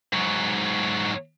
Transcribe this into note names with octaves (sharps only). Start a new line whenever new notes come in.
G#2 F#3